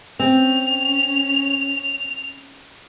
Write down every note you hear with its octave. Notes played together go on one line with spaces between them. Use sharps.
C4 C#4 F7